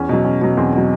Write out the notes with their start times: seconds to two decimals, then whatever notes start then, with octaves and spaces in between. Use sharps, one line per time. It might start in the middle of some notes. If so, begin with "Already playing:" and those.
Already playing: E2 C#4
0.09 B2 F#3
0.25 E2 C#4
0.41 B2 F#3
0.57 E2 C4
0.73 B2 F#3